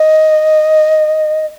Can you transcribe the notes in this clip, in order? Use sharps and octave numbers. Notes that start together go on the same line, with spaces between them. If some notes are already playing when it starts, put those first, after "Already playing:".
Already playing: D#5